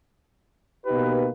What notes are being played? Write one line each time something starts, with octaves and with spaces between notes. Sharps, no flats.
B2 A#3 D#4 G4 B4